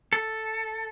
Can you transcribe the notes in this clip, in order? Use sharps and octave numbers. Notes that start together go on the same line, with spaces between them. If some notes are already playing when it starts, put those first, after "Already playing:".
A4